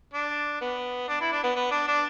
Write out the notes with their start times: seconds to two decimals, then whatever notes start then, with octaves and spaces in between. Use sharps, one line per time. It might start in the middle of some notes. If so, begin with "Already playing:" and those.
0.14 D4
0.61 B3
1.08 D4
1.21 E4
1.32 D4
1.44 B3
1.56 B3
1.71 D4
1.88 D4